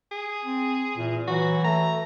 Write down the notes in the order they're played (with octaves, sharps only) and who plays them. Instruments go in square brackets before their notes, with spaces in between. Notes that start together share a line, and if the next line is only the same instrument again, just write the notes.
[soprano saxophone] G#4
[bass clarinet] C4
[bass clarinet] A#2 [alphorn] E3
[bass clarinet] E3 [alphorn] F#3 [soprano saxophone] F#4
[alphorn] A3 [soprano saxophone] A#5